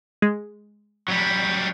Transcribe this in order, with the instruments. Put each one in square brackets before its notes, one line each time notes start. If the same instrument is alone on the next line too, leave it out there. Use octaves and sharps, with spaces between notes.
[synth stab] G#3
[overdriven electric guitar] F#3 G3